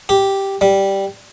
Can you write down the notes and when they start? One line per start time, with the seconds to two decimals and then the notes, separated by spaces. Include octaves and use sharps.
0.09 G4
0.61 G3